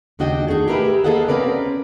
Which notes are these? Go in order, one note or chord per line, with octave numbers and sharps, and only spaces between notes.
D#2 C#3 D4 F#4 D#5 G5
D#3 A3 D#4 G#4
G4 G#4 A#4 B4 E5
A#3 G#4 A4 D#5 F5 F#5
C4 C#4 A#4 B4 D5